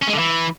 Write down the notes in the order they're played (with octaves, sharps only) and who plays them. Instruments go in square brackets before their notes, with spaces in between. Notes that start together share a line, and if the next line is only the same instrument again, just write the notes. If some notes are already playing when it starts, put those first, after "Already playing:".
[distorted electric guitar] C#4
G#3
D3
E3